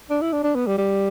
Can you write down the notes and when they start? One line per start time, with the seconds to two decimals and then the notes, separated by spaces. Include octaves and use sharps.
0.10 D4
0.21 E4
0.33 D4
0.44 D4
0.55 B3
0.67 G3
0.78 G3